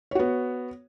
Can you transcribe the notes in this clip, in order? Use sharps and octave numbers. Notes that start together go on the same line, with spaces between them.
B3 F#4 C#5